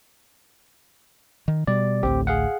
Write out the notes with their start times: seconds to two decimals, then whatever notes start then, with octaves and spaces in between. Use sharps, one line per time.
1.48 D#3
1.67 B2 G3 D5
2.03 A1 D2 A2 C4 G4
2.27 G#4 F5 F#5